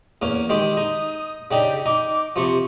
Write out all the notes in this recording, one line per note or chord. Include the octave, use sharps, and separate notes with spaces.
E2 A#3 C#4
D#3 G#3 G4 D#6
D#4
C#3 D4 D#4 G4
D#4 D6
C3 F3 C#6